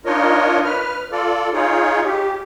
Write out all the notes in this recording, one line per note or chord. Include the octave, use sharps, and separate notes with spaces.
D4 D#4 F4 A#4 C#5 D#5
B4 F6
F4 A4 D5
D#4 F4 G#4 C#5
G4